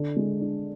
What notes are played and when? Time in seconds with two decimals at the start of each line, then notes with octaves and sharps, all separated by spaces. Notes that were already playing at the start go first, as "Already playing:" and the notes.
Already playing: D3
0.16 G#3
0.41 D4